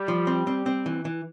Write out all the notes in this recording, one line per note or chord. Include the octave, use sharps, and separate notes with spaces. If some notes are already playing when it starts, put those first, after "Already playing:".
Already playing: G3
F3
C4
C4
C4
E3
E3